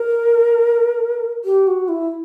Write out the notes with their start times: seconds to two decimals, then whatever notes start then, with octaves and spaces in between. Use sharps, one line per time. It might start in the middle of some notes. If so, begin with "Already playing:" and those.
Already playing: A#4
1.45 G4
1.67 F#4
1.89 E4